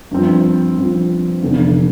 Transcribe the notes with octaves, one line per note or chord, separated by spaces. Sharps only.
G2 F3 C4
G2 F3 C4
F1 E2 D3